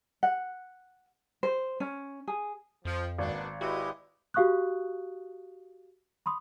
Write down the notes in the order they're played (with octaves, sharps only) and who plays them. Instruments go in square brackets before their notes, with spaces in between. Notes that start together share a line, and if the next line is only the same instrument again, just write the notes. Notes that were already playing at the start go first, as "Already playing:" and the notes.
[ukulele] F#5
C5
C#4
G#4
[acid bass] F2 [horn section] F3
[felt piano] G#1 [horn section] B2 A#3 D4
[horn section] G#3 B4 D#5 [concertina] E4 G4 [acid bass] F#4
[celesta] F#4 G4 F5 C#6 D#6 F#6
B5 C6 D#6